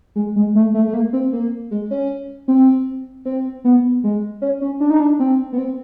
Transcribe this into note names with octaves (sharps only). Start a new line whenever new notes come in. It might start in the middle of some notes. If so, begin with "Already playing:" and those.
G#3
G#3
A3
A3
A3
A#3
C4
A#3
G#3
C#4
C4
C4
B3
G#3
C#4
C#4
D4
D#4
D4
C4
B3
C4